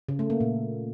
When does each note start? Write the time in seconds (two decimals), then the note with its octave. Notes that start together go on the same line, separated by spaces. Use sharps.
0.09 C#3
0.19 A3
0.30 A#3
0.41 A#2